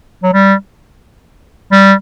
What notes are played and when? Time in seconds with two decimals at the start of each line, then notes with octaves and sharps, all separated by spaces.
0.23 F#3
0.33 G3
1.72 G3